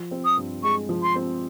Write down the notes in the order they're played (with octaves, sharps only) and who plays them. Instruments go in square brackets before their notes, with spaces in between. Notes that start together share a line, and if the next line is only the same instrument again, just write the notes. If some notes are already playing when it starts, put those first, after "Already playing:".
Already playing: [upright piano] F3
C4
[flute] D#6
[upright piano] G2
[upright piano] G#3 [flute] C#6
[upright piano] F3
[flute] C6
[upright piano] C4